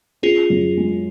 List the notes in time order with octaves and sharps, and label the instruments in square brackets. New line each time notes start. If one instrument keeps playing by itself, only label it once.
[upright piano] C#4 [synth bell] F4 G#4
[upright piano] F#2
G#3